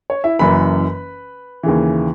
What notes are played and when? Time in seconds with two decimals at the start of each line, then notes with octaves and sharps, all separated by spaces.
0.10 C#5
0.24 E4 E5
0.39 F#1 F#2 E3 B4 B5
1.63 D#2 C#3 E3